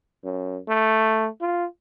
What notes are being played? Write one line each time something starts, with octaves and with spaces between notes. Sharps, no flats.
F#2
A3
F4